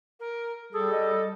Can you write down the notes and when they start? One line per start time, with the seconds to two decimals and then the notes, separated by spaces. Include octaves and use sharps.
0.20 A#4
0.73 G3 G#4 A4
0.92 D#5